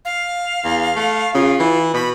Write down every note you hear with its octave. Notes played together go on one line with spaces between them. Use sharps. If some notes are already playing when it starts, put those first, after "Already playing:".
F5
E2
A3
C#3 F4
E3
B2 B5